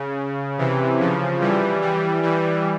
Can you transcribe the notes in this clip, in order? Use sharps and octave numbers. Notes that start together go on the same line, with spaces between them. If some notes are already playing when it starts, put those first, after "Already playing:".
Already playing: C#3
C3 E3
C#3 F3
E3 G3
E3 G3
E3 G3